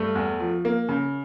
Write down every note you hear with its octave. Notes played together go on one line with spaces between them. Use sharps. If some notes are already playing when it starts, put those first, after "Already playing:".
Already playing: G2 A3
E2
F3
A#3
C#3